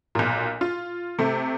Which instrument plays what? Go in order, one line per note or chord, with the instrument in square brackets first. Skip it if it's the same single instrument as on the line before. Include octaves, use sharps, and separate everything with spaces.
[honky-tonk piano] B1 A#2
F4
C3 A3